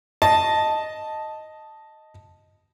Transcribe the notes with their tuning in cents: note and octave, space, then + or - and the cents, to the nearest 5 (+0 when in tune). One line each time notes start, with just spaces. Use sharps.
D#5 +0 A5 +0